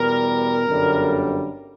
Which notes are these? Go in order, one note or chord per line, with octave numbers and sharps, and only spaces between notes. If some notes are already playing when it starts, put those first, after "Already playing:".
Already playing: E2 B2 G3 A#4
G1 F#2 D3 G3